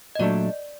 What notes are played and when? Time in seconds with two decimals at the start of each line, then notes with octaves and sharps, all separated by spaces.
0.15 D#5
0.19 A#2 F#3 A3 D4 D5